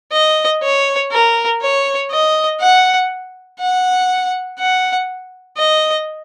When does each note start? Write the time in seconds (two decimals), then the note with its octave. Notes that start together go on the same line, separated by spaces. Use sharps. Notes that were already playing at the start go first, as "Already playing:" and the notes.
0.13 D#5
0.63 C#5
1.12 A#4
1.62 C#5
2.11 D#5
2.61 F#5
3.60 F#5
4.59 F#5
5.58 D#5